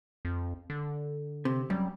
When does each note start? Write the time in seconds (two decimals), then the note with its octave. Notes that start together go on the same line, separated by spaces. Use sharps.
0.25 F2
0.70 D3
1.45 C3
1.70 F#2 G3